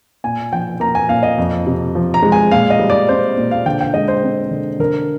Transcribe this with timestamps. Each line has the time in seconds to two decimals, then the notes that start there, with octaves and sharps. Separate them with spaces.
0.24 A#2 G#5
0.52 F3 G5
0.80 A#3 A#5
0.95 G#5
1.09 A#2 F5
1.23 D#5
1.38 F2
1.67 C3
1.95 F3
2.14 A#5
2.23 G#3
2.32 G#5
2.51 A#2 F5
2.70 D#5
2.80 G3
2.90 D5
3.09 C4 C5
3.38 A#2
3.51 F5
3.66 D3 G5
3.81 G5
3.94 G#3 D#5
4.08 C5
4.23 C4
4.51 D3
4.79 D3 A#4